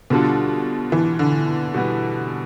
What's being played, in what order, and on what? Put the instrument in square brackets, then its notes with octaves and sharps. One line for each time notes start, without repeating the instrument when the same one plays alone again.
[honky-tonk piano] B2 [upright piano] D3 G3 D4 F4 A4
[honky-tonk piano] E3
D3
[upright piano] B2 G3 B3